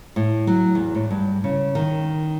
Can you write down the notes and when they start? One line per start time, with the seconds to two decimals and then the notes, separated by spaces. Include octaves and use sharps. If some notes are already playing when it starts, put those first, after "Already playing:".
0.16 A2
0.47 F#3
0.75 E2
0.95 A2
1.11 G2
1.44 C#3
1.75 D#3